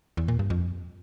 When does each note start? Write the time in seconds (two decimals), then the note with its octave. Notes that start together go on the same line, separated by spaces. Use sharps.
0.17 E2
0.28 A#2
0.39 G2
0.50 F2